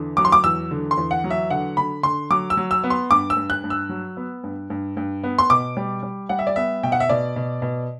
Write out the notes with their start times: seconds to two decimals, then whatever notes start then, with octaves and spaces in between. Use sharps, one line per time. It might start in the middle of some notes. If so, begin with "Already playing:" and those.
Already playing: E2 D3
0.17 F#3 D6
0.25 C6
0.32 D6
0.44 E2 E6
0.71 D3
0.91 C6
0.98 E2
1.11 F#5
1.24 F#3
1.31 E5
1.50 D3 F#5
1.77 D3 B5
2.03 D3 C6
2.30 F#3 D6
2.50 E6
2.57 F#3
2.71 E6
2.84 B3
2.90 C6
3.10 G2 D6
3.30 E6
3.37 G2
3.50 F#6
3.64 G2
3.70 E6
3.89 F#3
4.17 B3
4.44 G2
4.70 G2
4.97 G2
5.24 B3
5.38 C6
5.50 B2 D6
5.77 G3
6.03 G3
6.29 G3 F#5
6.39 E5
6.47 D5
6.56 B3 E5
6.83 B2 G5
6.92 F#5
7.00 E5
7.09 B2 D5
7.36 B2
7.62 B2